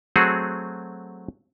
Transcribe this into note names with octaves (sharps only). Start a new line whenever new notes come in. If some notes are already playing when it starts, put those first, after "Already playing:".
F#3 A3 C4 F#4 G#4